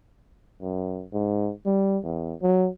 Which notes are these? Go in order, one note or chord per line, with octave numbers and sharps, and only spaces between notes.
F#2
G#2
G3
E2
F#3